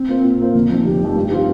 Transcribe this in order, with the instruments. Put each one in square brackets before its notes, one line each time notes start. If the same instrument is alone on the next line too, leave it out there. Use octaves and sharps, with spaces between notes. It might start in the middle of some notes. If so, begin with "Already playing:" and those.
Already playing: [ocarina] C4
[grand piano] A#3 F4 C5
A#2
A#3 F4 C5
[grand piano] F1 [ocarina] A#3
[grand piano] F2 D#3 [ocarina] C4
[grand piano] F1 [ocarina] G4
[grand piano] F2 D#3
G2
D#3 C4 F4